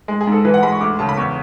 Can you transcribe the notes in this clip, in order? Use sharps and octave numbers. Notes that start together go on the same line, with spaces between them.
G#3
G#4
G#2 A4
E3 B4
F#5
G#3 B5
C#6
D2 D6
C#3 A5
B5
E2 C#6